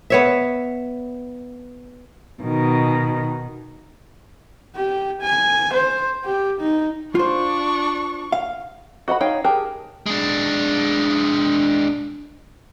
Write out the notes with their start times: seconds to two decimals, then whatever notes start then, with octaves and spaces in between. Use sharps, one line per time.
0.10 B3 C#5 E5
2.43 B2 D#3
4.75 G4
5.21 G#5
5.73 C5
6.24 G4
6.60 D#4
7.15 D4 F4 C5 C#6
8.32 F5
9.08 F#4 D#5 F#5 B5
9.21 D#4 C#5 F5 G5
9.44 G4 G#4 A#4 A5
10.06 G#3 D4